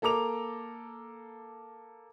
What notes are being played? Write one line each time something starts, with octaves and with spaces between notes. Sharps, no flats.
A#3 A4 A#5 D6 F7